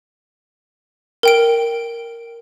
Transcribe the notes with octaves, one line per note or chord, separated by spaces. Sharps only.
A#4 G5 D7